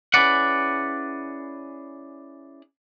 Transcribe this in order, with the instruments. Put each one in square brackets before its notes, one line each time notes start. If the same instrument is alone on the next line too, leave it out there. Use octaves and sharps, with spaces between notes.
[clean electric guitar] C#4 E4 G#4 B4 D5 F#5